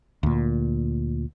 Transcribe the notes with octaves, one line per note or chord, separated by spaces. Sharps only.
D2 A#2